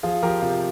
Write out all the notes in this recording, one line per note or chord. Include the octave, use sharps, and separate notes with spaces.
F3 F4 G#4
F3 G4 A#4
C3 F4